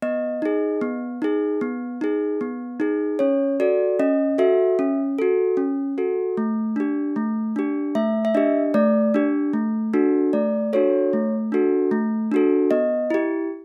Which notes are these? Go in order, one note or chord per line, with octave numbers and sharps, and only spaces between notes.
B3 D#5
D#4 G#4
B3
D#4 G#4
B3
D#4 G#4
B3
D#4 G#4
C#4 C#5
F#4 A4 D5
C#4 D#5
F#4 A4 E5
C#4
F#4 A4
C#4
F#4 A4
A3
D4 G4
A3
D4 G4
A3 E5
E5
D4 G4 D#5
A3 D5
D4 G4
A3
D4 F#4 A4
A3 D5
D4 F#4 A4 C#5
A3
D4 F#4 A4
A3
D4 F#4 A4
B3 D#5
E4 G4